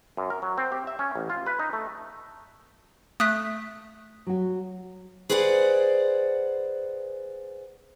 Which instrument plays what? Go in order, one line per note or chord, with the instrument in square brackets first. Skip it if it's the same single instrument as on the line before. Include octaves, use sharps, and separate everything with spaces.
[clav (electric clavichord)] F#2
A#4
F#3
C4
G4
E5
C#4
A1
F4
B4
D#4
A3
[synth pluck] A3 [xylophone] D#6 F#6 B6
[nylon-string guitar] F#3 F#4
[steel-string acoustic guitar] G#4 B4 C5 D5 F5 F#5